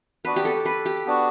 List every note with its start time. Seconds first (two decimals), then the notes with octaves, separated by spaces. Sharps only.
0.25 B3 D4 F#4 B4
0.36 G4
0.45 A4
0.65 B4
0.86 G4
1.06 B3 D4 F#4